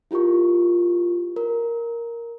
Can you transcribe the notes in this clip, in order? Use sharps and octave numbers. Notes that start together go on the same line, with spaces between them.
E4 F4 G4 A#4 C#6
A#4